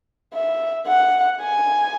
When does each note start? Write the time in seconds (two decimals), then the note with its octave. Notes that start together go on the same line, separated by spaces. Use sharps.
0.34 E5
0.87 F#5
1.41 G#5